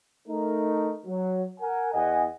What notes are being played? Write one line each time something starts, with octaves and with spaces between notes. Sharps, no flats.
A3 D#4 A#4
F#3
A#4 F#5 G#5
E2 D#5 F#5 G#5